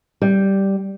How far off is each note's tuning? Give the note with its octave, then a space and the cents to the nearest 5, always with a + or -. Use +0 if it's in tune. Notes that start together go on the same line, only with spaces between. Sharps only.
G3 -5